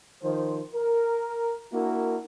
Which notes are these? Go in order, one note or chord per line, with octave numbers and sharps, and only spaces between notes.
D#3 F3 C5
A#4
A#3 D4 E4 F#4 A#4